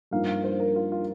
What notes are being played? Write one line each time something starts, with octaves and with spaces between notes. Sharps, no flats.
G2 F3 A#3 D#4 F5
F5
C5
A#4
F4
F4